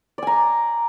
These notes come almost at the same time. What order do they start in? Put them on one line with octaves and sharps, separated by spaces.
D5 G#5 A#5